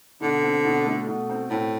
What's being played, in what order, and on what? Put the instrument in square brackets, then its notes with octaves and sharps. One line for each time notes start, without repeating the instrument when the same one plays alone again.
[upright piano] B2 [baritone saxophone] D3
[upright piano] C4
B2
A3
B2
C4
[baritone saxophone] A2 [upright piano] C4